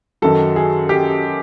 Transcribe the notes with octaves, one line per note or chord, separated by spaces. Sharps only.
F#2 D#3 F#3 A4
G#4
G4